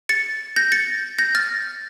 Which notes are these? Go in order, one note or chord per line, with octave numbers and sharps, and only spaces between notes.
A6 C#7
G6 A#6
A6 C#7
G6 A#6
F6 A6